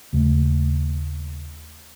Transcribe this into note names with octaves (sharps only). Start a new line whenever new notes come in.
D#2 C#3 A3